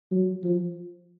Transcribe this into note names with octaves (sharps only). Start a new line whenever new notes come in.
F#3
F3